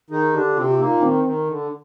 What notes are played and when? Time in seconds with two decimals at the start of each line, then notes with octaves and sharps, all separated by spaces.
0.10 D#3 D#4 G#4
0.33 D3 D4 G4
0.56 C3 C4 F4
0.64 G4
0.71 F4
0.79 A#2 A#3 D#4
1.02 D#3 C4
1.24 D#3
1.48 D3